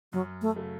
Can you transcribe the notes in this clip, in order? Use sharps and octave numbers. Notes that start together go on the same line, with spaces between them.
F#2 F#3
A3
C#3 F#3 A3